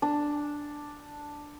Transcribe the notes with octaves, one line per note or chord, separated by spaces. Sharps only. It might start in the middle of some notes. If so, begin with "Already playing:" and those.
D4